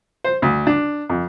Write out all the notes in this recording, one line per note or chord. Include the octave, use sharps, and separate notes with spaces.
C5
D2
D4
F2